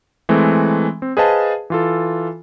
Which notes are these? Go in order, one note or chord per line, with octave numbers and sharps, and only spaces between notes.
E3 G#3 A3 C4
C4
G#4 B4 C5 D#5 F5 A5
E3 F4 A4